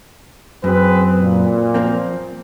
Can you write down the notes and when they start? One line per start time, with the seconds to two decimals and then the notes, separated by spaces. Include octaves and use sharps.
0.64 F#2 C4 G#4 B4
1.21 A#2
1.74 F3 A#3 C4